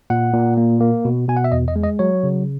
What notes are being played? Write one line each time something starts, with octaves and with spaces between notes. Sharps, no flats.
A#2 F#5
A#2
A#3
A#3
B2
B2 G#5
F#5
E5
E2 D#5
D#5
G#3
D#5
F#3 C#5
C#3